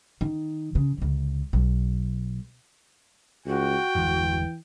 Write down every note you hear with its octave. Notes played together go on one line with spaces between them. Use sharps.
D#3
C#3
C#2 D3
B1
C#2 F#4 G5
G1 E2 E3 G#3